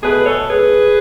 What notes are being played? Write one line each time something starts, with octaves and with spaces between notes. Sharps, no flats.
B2 A3 G#4 B4
A4 C#5
G#4 B4